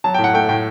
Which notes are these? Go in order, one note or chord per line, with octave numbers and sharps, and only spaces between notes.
F#3 A5
A2 G5
F#5
A3 G5
A2 G5